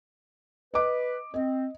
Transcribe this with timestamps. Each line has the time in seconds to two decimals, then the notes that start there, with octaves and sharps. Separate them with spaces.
0.74 B4 D#5 D6
1.34 C4 D#5